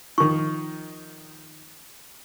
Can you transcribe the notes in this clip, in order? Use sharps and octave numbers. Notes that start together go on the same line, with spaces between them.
D#3 F3 C#6